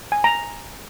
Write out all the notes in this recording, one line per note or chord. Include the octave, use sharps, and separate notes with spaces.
G#5
A#5